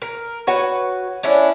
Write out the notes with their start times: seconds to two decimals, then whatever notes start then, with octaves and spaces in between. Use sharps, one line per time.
0.02 A#4
0.47 F#4 B4 C#5
1.23 C#4 D4 E4